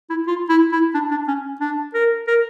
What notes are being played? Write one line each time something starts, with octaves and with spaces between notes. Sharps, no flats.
E4
F4
E4
E4
D4
D4
C#4
D4
A#4
A#4